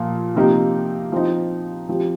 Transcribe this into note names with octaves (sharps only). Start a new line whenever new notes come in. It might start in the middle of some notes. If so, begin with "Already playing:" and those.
Already playing: A#2 F3 A#3
C3 F3 A#3 D#4 G4
F3 C4 D#4
F3 C4 G4